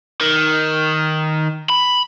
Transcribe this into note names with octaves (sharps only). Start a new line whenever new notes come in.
D#3
B5